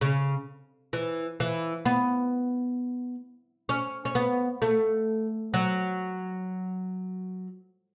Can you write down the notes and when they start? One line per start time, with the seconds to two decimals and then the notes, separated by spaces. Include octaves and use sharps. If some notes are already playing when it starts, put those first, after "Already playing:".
0.01 C#3
0.93 E3
1.40 E3
1.85 B3
3.69 C#4
4.05 C#4
4.15 B3
4.62 A3
5.54 F#3